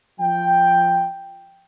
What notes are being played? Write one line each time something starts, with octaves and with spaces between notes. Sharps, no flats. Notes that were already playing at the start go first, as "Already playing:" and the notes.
F3 G5